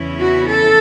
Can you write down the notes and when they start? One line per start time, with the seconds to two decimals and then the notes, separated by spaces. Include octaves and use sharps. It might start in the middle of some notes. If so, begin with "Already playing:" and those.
Already playing: E2 C#3 E3 C#4 E4
0.20 F#4
0.48 A4